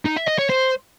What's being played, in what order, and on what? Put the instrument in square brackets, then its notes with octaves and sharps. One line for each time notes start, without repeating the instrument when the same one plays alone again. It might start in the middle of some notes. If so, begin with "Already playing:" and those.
[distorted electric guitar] D#4
E5
D#5
C#5
C5